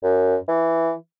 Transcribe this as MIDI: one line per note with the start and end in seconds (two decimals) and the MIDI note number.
0.04 0.36 42
0.48 0.92 52